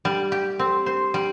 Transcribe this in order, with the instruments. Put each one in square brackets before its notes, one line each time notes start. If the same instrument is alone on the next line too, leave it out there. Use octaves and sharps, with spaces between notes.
[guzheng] G3
G4
C4
C5
G3